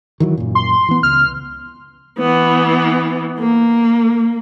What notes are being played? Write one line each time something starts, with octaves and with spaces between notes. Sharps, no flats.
D#3 E3 F#3
F#2 A#2
C6
E3 B3
C#2 F6
E3 B3
A#3